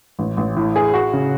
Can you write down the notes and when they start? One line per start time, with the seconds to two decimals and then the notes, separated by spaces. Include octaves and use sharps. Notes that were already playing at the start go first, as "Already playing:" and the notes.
0.19 A1
0.37 A1
0.57 A2
0.76 G#4
0.94 F#4
1.13 C#3